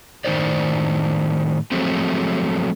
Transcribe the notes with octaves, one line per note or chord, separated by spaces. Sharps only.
A2 D#3 E3 D#4 C5 D5
F3 F#3 G#3 A3 C4